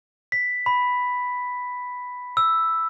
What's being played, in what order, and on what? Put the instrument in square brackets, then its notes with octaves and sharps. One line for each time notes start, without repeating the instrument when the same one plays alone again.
[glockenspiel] B6
B5
E6